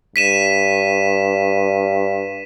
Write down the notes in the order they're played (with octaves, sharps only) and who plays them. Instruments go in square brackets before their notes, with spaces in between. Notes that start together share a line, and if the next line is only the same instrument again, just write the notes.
[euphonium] G2 [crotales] B6 D#7 E7